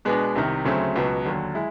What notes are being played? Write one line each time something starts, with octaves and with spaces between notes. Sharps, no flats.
B2 G#3 B3 D4
C2 C3 D#3
D2 C#3 F#3 A3 C4
C#2 B2 F#3 B3
D#2 D3 F#3
G#3 E4